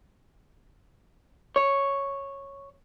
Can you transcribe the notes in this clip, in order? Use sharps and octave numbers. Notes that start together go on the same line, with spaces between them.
C#5